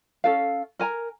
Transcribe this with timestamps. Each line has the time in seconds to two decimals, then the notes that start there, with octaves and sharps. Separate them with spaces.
0.24 C#4 A4 F5
0.79 A#4 G#5 A#5